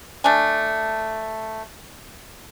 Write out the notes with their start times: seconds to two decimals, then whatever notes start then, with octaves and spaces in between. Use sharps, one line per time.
0.24 A3 D4 G#5